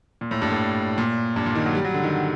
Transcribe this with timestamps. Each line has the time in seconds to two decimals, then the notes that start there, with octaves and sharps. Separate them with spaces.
0.21 A#2
0.31 A2
0.42 G2
0.52 A2
0.98 A#2
1.36 G2
1.46 A#2
1.55 D#3
1.66 F#3
1.75 G3
1.84 F#3
1.94 D3
2.04 D#3